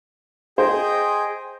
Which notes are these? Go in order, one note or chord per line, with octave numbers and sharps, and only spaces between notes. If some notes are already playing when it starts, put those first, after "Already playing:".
G#4 C5 D#5 G5